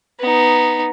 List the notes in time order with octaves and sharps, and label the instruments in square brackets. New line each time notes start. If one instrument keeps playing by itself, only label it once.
[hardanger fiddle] B3 D#4